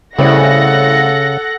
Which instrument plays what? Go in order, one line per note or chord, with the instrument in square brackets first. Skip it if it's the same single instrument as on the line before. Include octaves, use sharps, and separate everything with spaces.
[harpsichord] C2 A2 [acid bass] C#3 [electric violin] A4 [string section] F#5 A#6